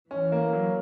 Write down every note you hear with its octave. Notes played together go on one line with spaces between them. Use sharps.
E3 C#4
A#3
F#3